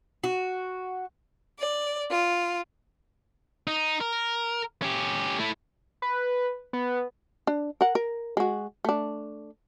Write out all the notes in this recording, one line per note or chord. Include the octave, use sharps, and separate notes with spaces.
F#4
D5
F4
D#4
A#4
C#4 G4
A3 E4
B4
B3
D4
A#4 F#5
A#4
G#3 F#4
A3 D4